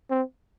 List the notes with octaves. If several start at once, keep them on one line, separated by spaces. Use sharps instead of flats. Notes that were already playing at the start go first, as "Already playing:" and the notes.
C4